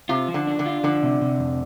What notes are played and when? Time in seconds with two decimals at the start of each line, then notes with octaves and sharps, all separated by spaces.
0.09 C3 F4
0.28 F3
0.34 D3
0.47 D4
0.59 D3
0.66 F4
0.83 D3 F3
1.03 C3
1.21 C3
1.40 F2